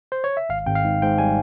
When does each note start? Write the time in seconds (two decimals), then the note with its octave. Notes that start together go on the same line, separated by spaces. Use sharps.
0.12 C5
0.24 C#5
0.37 E5
0.49 G#1 F5
0.66 G#1 G5
0.75 F5
0.84 G#2
1.02 G#2 G5
1.18 G3 G#5